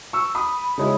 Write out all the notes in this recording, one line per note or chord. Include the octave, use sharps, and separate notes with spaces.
C#6 E6
B5 D#6
C#3 G#3 C#4 E4